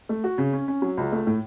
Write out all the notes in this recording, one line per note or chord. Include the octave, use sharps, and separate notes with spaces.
A3
F#4
C#3
C#4
C#4
F#3
C#2
A3
A2